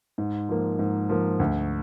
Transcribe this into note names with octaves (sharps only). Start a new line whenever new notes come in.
G#2
F3 A#3
G#2
F3 A#3
D2